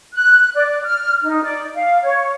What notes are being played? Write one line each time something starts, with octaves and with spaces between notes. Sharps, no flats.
F#6
D5
F6
D#4
D5
F5
C#5